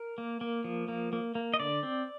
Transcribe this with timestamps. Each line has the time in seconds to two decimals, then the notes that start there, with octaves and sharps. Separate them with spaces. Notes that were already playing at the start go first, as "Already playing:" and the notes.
Already playing: A#4
0.18 A#3
0.41 A#3
0.64 F3
0.88 A#3
1.13 A#3
1.35 A#3
1.54 D#5
1.60 D3 D5
1.83 C4